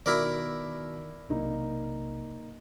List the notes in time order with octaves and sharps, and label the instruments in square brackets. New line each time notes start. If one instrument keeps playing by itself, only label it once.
[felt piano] B2 F#4 [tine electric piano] D#3 [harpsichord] E4 A#4 D5
[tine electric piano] B1 C3 [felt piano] A#3 D#4